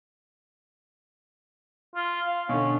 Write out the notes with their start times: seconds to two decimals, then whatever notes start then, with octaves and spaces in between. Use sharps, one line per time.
1.95 F4
2.26 F5
2.49 B2 D3 C#4